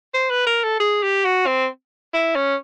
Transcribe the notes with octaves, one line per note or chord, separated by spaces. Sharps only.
C5
B4
A#4
A4
G#4
G4
F#4
C4
E4
C#4